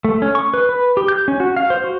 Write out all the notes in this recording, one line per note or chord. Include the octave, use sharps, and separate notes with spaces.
A3
C#4
C#6
B4
B4
G4
G6
C#4
F#4
F5
C5
F#4